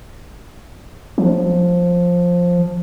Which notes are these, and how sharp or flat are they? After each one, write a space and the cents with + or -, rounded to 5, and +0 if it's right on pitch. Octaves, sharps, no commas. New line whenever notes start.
F3 +10